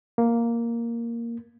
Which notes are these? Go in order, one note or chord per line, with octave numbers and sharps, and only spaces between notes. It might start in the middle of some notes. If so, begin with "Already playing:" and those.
A#3